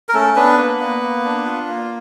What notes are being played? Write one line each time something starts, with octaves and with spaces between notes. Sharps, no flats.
A#4
A3 C#4 A4
B3 D4 B4
A#3
A#3
A#3
D4
F4
A#3